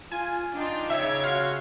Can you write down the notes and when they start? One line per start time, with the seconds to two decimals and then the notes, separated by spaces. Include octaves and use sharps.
0.12 F4 G#5
0.56 D4 D#4 F4 G5
0.90 C#3 C#5 E5 G#6
1.24 F#4 F5 C6